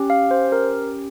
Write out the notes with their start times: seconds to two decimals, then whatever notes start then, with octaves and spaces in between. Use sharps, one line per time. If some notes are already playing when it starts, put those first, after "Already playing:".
Already playing: C#4 G4
0.10 F5
0.31 C5
0.52 A#4